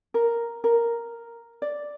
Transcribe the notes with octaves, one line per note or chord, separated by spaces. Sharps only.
A#4
A#4
D5